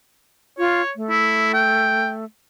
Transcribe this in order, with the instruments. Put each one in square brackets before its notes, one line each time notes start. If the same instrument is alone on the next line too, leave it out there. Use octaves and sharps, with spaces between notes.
[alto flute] F4 [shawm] C#5
[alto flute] A3
[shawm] E4
G5